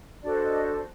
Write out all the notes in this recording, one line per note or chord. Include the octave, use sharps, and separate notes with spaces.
D4 F#4 A4 C5 D5
D#5